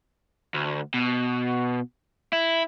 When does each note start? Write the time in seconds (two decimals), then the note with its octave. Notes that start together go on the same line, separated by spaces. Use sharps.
0.54 D2
0.94 B2
2.33 E4